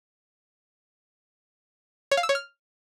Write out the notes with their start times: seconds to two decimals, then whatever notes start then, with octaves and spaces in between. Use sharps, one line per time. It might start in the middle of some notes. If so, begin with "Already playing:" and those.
2.11 C#5
2.17 F5
2.23 E6
2.29 C#5
2.35 F6